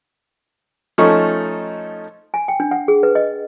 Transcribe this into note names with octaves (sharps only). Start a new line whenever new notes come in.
F3 A3 C#4 D#4 A4 C#6
G#5
G5
D4
F#5
G#4
B4
D#5